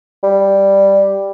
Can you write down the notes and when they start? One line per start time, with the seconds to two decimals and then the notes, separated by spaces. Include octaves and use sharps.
0.24 G3